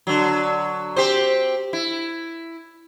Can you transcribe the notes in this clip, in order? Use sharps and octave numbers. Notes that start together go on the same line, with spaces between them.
D3 F#3
C4 G4 C5
E4